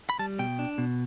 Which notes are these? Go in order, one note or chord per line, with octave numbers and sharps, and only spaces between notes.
B5
G3 A5
B2 G5
D4
B2